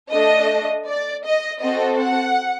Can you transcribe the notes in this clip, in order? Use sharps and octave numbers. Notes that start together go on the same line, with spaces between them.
A3 D4 A4 D#5
D5
D#5
C4 F#4 A4 D#5
F#5